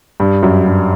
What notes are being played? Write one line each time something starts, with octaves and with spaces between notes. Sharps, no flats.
G2
F#2
G2